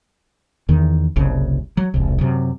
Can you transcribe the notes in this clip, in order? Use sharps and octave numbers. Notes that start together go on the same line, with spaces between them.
E2 D#3
F#1 C2 C#3
F#3
E1 C2
F#2 C3